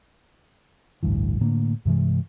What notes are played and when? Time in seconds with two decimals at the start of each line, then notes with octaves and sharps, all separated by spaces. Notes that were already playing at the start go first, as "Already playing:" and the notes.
1.03 A1 D2 G2 E3
1.41 A2 D3 A#3
1.85 G2 C3 E3 G#3